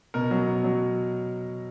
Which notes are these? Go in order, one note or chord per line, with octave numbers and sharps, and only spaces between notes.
B2 A#4
F#3
B2
F#3